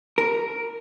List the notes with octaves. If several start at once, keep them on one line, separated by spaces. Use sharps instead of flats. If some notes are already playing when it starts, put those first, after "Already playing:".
A#4